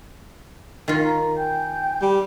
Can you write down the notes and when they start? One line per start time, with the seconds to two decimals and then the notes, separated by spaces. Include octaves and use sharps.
0.88 D#3 F4
1.04 A#5
1.36 G5 G#5 G6
2.02 G3